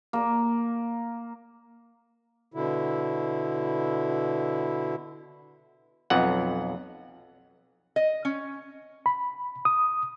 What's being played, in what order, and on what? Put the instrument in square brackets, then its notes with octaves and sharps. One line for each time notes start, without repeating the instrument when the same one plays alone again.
[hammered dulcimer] A#3
[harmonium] B2 D3 E4
[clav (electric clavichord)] B1 F2 F#5
[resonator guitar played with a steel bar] D#5
C#4
[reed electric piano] B5
D#6